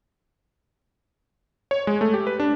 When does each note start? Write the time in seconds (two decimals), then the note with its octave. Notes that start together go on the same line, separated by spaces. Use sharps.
1.71 C#5
1.87 G#3
2.01 A3
2.14 G4
2.27 B4
2.40 D4